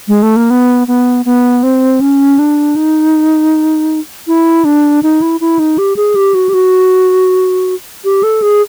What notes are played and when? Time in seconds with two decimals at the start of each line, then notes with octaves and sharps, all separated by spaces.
0.08 G#3
0.23 A3
0.36 A#3
0.50 B3
0.88 B3
1.25 B3
1.63 C4
2.01 C#4
2.39 D4
2.76 D#4
4.27 E4
4.65 D4
5.03 D#4
5.22 E4
5.41 E4
5.59 D#4
5.78 G4
5.96 G#4
6.15 G4
6.34 F#4
6.49 G4
6.54 F#4
8.05 G4
8.23 A4
8.42 G#4